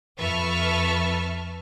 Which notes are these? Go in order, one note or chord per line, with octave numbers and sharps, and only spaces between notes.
F2 B4 E5 A5 C#6 F6